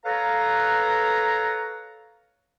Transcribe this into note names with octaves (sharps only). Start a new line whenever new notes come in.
A4 B4 C#5 F5 A#5